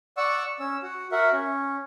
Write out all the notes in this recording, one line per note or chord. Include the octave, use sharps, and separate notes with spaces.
D5 F#5 C#6 E6
C#4 E6
F#4
F#4 A#4 E5 F#5
C#4